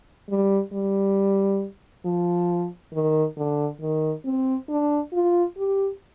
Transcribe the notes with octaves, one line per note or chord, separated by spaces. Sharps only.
G3
G3
F3
D#3
D3
D#3
C4
D4
F4
G4